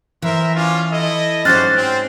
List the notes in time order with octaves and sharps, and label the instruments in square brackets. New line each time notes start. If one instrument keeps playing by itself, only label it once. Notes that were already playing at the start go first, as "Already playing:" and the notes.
[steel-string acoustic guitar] E3 [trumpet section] A#4 C5 E5
[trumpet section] C#4 D4 F4
E4 A4 D#5
[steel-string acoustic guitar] G#2 C#4 [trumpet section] F#4 G4 C5 [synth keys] F6 F#6 A6
[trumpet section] C4